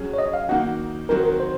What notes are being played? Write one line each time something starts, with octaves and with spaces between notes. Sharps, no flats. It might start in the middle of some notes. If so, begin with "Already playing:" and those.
Already playing: F#3 C#4 G#4
C#5
D#5
F5
D#3 A#3 D#4 F#4 F#5
D#3 F#3 C4 F#4 A#4
A#4
C5